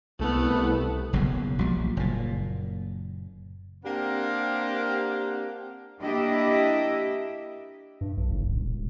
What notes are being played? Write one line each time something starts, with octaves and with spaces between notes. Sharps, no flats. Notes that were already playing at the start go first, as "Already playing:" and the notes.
C2 A3 B3
F#1 B1 F#2 C#3
A#1 F#3 G3
F#1 A#2
A#3 C4 D4 G4 A#4 F#5
A#3 D4 E4 G4 D#5 E5
G2
B1
F#1
D#1
D#1
E1